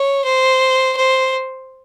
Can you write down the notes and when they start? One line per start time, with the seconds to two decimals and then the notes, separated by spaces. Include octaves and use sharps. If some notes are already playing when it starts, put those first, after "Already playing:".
Already playing: C#5
0.25 C5
0.97 C5